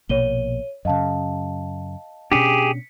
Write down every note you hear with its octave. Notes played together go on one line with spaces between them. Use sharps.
A#1 B2 A#3 C#5 D#7 G7
F#2 C#3 D#5 F5 A5
B2 C#4 D4 G4 G#4 B6 C#7